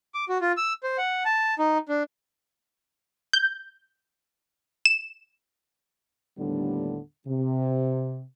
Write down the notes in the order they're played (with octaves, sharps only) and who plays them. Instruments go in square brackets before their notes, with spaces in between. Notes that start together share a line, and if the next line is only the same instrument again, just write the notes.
[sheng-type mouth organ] D6
F#4
F4
E6
C5
F#5
A5
D#4
D4
[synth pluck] G6
E7
[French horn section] D#2 A2 D3 G3 B3 D4
C3